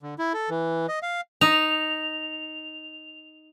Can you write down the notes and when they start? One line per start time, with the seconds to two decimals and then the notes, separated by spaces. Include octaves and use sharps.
0.03 D3
0.19 E4
0.34 A4
0.50 E3
0.89 D#5
1.03 F5
1.41 D#4 F7